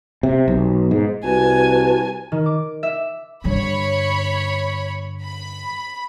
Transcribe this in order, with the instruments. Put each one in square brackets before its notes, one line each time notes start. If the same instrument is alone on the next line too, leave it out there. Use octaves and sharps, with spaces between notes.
[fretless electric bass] C3
B1
G#2
[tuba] C2 [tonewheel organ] F#4 B4 A5 [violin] G#5
[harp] D#3
D6
E5
[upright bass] G2 D3 [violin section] C#5 B5
[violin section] B5